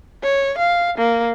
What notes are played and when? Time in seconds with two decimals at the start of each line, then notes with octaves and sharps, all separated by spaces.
0.23 C#5
0.58 F5
0.98 A#3